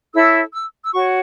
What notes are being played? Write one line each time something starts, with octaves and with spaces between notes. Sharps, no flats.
E4 A4 C#5 E6
E6
E6
F#4 C#5 C#6